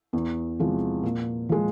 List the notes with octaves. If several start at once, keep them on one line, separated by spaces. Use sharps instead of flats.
E2
C3 F3 G#3
A#2
F3 G#3